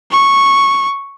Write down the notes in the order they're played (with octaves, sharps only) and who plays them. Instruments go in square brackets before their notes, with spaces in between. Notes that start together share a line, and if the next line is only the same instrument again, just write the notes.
[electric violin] C#6